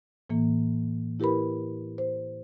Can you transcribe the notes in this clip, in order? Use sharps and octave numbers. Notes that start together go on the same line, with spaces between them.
A2 E3 A#3
E4 G4 A#4 B4 B5
C5